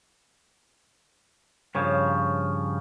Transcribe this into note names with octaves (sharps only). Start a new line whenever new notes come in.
G2 C#3 F3 C#5 F5